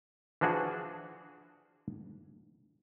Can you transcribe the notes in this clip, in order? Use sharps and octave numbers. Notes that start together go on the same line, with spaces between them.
E3 F3 D4 F#4 G#4